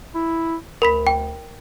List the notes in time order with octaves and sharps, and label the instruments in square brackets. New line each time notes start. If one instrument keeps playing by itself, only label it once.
[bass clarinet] E4
[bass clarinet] D2 [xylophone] A#4 B5 B6
[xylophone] G5